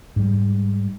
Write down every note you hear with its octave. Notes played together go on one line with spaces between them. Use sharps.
G#2 G3